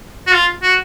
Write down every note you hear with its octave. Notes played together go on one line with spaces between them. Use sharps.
F#4
F4
F#4